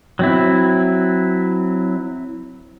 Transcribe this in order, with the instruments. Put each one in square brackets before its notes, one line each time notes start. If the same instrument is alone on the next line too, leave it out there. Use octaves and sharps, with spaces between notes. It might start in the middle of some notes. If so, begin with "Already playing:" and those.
[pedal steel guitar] F#3 C4 E4